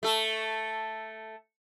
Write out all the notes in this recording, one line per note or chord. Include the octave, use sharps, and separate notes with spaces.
A3 A4